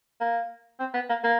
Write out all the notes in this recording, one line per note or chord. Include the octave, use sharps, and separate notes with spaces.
A#3
C4
B3
A#3
A#3